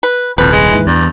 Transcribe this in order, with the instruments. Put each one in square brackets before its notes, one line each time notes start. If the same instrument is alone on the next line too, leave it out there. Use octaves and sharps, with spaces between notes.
[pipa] B4
[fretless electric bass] D#1 C2 [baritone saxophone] F2 [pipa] B4
[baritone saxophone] G#3
[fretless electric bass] D#2 G#2 E3
[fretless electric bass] E2 [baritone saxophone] G2